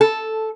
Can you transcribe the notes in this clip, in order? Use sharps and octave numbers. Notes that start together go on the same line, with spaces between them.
A4